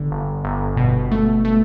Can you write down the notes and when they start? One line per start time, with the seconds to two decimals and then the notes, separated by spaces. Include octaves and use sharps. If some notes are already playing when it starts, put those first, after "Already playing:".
Already playing: G1 D3
0.11 G1
0.45 G1
0.77 B2
1.11 A3
1.45 A3